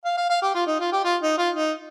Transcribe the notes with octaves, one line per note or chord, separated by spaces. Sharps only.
F5
F5
F5
G4
F4
D#4
F4
G4
F4
D#4
F4
D#4